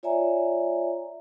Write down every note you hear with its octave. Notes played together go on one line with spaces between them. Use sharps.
F4 C#5 D5 E5 G#5 A#5